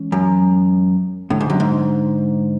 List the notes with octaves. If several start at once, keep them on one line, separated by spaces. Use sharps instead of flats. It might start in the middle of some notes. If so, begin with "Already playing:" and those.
Already playing: E3 G#3 C#4
F#2
A2 D3 G#3 D4
G#2
F#2
G#2